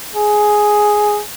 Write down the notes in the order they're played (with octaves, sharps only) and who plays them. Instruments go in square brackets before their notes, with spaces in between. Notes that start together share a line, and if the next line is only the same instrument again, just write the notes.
[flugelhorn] G#4